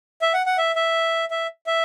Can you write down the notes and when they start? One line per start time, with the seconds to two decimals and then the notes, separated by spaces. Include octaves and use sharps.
0.22 E5
0.34 F#5
0.46 F#5
0.58 E5
0.76 E5
1.31 E5
1.67 E5